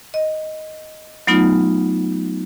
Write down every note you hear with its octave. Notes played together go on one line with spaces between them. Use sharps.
D#5
F#3 A3 B3 D#4 F4